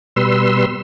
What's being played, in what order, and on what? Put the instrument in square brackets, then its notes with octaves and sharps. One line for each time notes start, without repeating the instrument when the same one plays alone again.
[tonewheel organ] B2 G3 B4 C6 E6